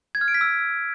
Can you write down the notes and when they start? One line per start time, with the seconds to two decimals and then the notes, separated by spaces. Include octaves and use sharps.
0.15 G#6
0.21 F6
0.28 D7
0.34 B6
0.41 E6